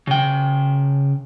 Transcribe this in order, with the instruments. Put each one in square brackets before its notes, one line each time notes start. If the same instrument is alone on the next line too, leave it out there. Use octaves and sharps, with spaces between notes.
[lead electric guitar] C#3 G5